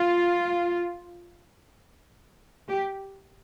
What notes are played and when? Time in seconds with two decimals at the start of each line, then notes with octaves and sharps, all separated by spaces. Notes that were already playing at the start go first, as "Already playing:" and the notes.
Already playing: F4
2.68 G4